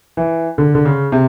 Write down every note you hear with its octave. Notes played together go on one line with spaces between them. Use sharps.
E3
D3
D3
C#3
C3